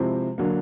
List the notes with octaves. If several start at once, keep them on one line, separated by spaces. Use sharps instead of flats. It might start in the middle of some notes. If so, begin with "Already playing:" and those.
Already playing: C3 F3 G#3 C4 E4
D3 F#3 A#3